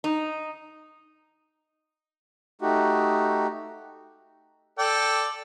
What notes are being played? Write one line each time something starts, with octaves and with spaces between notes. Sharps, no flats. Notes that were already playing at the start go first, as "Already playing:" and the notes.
D#4
A3 D#4 F#4 G4
A4 D5 G5